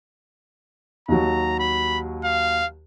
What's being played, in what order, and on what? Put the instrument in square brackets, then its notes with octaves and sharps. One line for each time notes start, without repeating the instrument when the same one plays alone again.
[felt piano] D#2 F#3 [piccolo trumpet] A#5
[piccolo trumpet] B5
F5